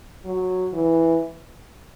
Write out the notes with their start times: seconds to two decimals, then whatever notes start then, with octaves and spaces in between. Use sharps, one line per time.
0.25 F#3
0.73 E3